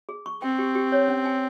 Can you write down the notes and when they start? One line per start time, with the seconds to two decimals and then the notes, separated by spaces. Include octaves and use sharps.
0.09 G#4
0.26 C#6
0.42 C4 G5
0.59 G4
0.75 G4
0.92 C#5
1.08 C#4
1.25 G#5